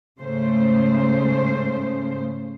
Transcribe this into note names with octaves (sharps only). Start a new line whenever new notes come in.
G#2 C#3 A3 C5